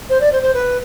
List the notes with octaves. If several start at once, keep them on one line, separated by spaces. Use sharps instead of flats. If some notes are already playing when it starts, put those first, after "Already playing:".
C5
D5
C5
C5
B4